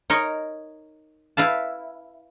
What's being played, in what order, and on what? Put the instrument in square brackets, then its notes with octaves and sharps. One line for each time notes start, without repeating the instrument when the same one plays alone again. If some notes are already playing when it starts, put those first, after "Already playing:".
[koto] D#4 A#4 C#5 D#5
E4 B4 F5 A5